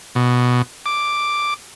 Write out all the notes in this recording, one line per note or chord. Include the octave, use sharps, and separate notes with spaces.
B2
D6